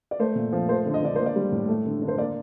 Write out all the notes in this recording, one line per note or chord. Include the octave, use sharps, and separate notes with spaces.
D5
A3 C5
A#2
F3
A3 C5
D3
D#5
D3 D5
A#3 C5
D5
G3
A2
A3
D3
D3
C5
A#3 D5